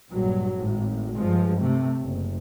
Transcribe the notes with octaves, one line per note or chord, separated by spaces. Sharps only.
A#1 G2 F#3
G#1 A2
G2 F3 G#3
C3 A3
F#1